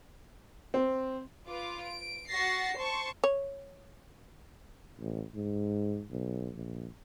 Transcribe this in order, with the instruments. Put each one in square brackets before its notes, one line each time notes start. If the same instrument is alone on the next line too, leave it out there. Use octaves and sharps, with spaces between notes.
[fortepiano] C4
[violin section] F4 B4 D6
D7
F#4 C#6 A6 A#6 C7
C5 A5 C6 C#6
[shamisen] C#5
[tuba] A1
G#2
B1
A#1